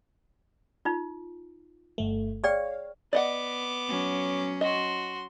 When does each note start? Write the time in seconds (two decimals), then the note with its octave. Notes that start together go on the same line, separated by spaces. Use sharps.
0.85 D#4 F4
1.98 G1 A3
2.44 G#4 C#5 D5 F5 G5
3.13 B3 D5 D#5 F#5 D6
3.89 F#3 C#4
4.61 F#4 D#5 C6